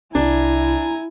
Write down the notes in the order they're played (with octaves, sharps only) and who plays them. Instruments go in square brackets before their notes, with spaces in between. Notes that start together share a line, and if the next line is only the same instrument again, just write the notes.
[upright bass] C2 [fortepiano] D4 [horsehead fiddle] E4 [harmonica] G#5 A#5